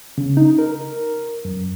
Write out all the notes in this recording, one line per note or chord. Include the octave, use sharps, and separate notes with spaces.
C#3
D#4
A#4
F#2